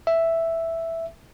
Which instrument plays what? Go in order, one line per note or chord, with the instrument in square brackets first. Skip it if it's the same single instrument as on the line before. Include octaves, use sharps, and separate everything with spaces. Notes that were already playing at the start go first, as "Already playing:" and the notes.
[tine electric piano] E5